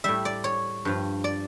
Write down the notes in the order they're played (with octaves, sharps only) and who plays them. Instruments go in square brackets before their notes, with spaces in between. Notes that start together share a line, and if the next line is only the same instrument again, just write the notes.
[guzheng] A2 G3 E5
D5
C#5
G2 F3
D5